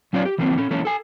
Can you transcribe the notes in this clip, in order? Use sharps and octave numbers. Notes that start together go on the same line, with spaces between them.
F#3 C#4 F4 C#5 D5
G4
E3 F3 A#3 C4
C#4 A4
E3 A#3 C#4 A4
A4 G#5